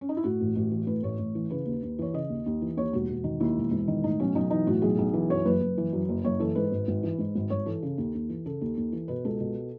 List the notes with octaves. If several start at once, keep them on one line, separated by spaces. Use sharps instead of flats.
C#4
D#4
E4
A2 F#4
A1
A1
E3
A2 B4
A1 C#5
A1
E3
C#3 B4
D#2
D#2
E3 C#5
C#3 D#5
D#2
D#2
E3
D#2 C#5
E1 F#4
E1
D#3
D#2 E4
E1
E1
D#3
A2 D#4
B1 C#4
B1 D#4
E3 D#4
A2 F#4
B1 G#4
B1
E3
F#2 C#5
F#1 B4
F#1
E3
F#2
F#1
F#1 C#5
E3 A4
G#2 B4
G#1
G#1
E3
G#2
G#1
G#1 C#5
E3 A4
C#3
D#2
D#2
E3
C#3 A4
D#2
D#2
E3
B2 B4
C#2 A4
B2